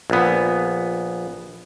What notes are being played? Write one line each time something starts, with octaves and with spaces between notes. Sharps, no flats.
A#1 B3